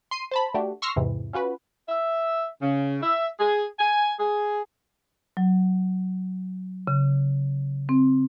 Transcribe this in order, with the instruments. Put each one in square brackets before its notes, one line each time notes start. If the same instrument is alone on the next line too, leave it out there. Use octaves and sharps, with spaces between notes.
[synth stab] C6 C7 D#7
C5 A5 B5
A3 D4 F#4 G4
C6 C#6 E6 F6 A#6 C7
E2 G#2 C3 E3
C#4 F4 F#4 B4
[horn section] E5
C#3
E5
G#4
G#5
G#4
[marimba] F#3
C#3
C4